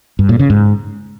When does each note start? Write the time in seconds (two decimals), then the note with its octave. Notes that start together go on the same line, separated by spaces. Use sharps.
0.19 G2
0.29 A#2
0.39 C#3
0.50 G#2